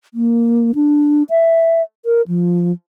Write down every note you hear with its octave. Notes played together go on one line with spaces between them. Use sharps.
A#3
D4
E5
A#4
F3